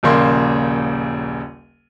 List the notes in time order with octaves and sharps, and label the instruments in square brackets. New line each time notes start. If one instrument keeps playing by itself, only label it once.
[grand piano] D#1 A#1 C#3 A#3 C6